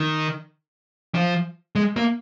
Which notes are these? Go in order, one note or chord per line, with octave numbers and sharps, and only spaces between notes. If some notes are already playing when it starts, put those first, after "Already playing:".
Already playing: D#3
F3
G#3
A#3